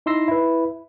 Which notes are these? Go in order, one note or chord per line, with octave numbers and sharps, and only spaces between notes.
D#4 E4 C6 E6 A#6 C7
E4 B4